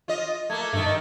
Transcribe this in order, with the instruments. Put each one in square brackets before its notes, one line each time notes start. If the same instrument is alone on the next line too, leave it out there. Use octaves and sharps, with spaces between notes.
[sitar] F4 D#5
[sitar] A3 A#3 [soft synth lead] G#6
[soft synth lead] G2 [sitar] D#3 A3
[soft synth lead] D#5